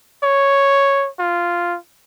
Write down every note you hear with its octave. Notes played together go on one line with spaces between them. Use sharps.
C#5
F4